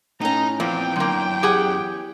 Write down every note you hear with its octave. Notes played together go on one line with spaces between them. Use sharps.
A2 C#4 D#4 A#5
E2 A#2 F3 C4 G5
F#2 D3 A#3
G4 G#4 F#5